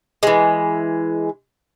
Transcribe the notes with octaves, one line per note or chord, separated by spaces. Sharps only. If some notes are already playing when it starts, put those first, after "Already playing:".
E3 G#3